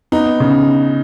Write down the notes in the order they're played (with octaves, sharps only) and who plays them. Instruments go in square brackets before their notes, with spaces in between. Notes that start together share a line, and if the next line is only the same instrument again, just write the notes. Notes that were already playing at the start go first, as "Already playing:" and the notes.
[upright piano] B3 [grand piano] D#4
[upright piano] C#3